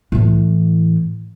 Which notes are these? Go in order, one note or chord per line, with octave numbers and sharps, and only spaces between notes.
A2 E3